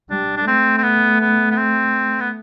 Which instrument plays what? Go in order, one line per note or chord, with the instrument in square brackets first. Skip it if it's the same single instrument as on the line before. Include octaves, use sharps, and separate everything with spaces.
[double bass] G3 [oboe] D4
[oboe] D4
[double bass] A3 [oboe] C4
[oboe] C4
B3
B3
B3
C4
B3